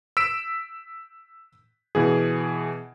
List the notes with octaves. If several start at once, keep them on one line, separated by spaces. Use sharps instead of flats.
E6 B6 D7 E7
B2 E3 G#4